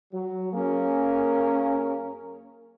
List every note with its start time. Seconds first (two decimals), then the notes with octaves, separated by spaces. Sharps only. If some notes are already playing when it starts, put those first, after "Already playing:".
0.14 F#3
0.53 F#2 A#3 C#4 G#4 A#4